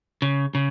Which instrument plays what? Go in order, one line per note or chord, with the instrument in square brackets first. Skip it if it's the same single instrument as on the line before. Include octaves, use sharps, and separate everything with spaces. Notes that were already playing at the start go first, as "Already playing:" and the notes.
[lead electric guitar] C#3
C#3